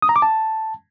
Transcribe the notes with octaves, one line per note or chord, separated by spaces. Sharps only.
D#6
A#5
D6
A5